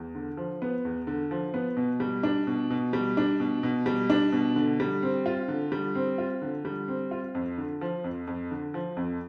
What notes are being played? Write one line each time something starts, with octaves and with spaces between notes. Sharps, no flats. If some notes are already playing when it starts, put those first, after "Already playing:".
Already playing: E2
D3
F3
B3
E2
D3
F3
B3
B2
G3
D4
B2
B2
G3
D4
B2
B2
G3
D4
B2
D3
G3
C4
F4
D3
G3
C4
F4
D3
G3
C4
F4
F2
D3
F3
F2
F2
D3
F3
F2